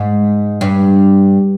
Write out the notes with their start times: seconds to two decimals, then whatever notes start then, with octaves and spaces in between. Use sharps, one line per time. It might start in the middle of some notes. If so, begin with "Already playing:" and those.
Already playing: G#2
0.61 G2